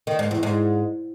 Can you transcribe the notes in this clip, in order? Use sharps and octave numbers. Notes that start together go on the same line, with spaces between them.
D#3
G#2
E2
G#2